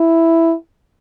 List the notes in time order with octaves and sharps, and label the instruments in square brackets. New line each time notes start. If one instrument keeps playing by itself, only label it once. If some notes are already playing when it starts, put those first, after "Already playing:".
Already playing: [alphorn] E4